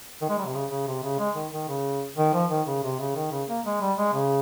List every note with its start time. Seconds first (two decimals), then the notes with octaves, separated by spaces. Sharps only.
0.22 D#3
0.29 G#3
0.38 G3
0.45 C3
0.54 C#3
0.71 C#3
0.87 C3
1.03 C#3
1.19 G#3
1.35 D#3
1.53 D#3
1.68 C#3
2.18 D#3
2.34 F3
2.51 D#3
2.67 C#3
2.83 C3
2.99 C#3
3.16 D#3
3.32 C#3
3.49 A#3
3.66 G#3
3.81 G3
3.98 G#3
4.13 C#3